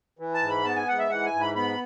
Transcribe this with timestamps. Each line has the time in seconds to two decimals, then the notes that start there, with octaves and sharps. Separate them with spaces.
0.19 E3
0.34 A5
0.42 G#2
0.50 B5
0.64 B3 A5
0.76 G#5
0.88 G#2 F#5
0.99 E5
1.10 E3 F#5
1.26 G#5
1.33 G#2
1.41 B5
1.55 B3 B5